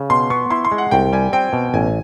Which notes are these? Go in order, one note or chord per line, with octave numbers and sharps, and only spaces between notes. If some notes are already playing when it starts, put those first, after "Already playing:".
Already playing: C#3
B2 C6
B3 C#6
E4 C6
C6
G#3
F#5
C2 G5
G3 G#5
C4 G5
B2
A1 G#5